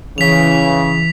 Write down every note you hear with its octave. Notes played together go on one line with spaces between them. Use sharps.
C#3 E3 B6 F7